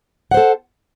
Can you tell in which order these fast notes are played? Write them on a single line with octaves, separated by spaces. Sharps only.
F#5 C5 A4